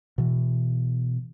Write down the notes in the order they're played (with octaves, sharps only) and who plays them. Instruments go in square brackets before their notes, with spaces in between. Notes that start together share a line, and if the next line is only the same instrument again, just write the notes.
[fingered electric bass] B2 E3